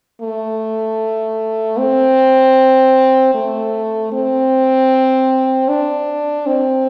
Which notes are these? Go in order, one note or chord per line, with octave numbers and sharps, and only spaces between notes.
A3
C4
A3
C4
D4
C4